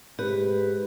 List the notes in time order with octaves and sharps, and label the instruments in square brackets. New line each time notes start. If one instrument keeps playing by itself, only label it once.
[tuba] G#2 [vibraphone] G4 [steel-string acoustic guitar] B4